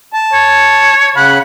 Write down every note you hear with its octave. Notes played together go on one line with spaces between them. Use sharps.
A5
C#5
C#3 F#5 B5